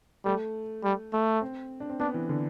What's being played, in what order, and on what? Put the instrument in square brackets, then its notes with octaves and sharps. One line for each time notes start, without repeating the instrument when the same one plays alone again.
[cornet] G3 [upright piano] A3
[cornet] G3
A3
[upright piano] C4
D4
C4
[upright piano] B3 [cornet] D4
[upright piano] E3
D3